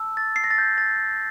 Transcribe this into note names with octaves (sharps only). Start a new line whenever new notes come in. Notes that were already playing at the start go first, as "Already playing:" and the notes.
Already playing: A5 E6
A6
C7
A#6
A6
G6
A6